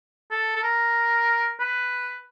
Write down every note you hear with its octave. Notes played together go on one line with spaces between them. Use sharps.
A4
A4
A#4
B4